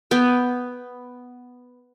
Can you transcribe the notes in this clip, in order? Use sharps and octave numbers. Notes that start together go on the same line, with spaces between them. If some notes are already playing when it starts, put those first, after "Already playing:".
B3 G5